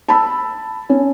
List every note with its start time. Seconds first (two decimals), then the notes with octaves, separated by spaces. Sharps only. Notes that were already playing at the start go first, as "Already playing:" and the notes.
0.09 A5 B5 E6
0.89 C#4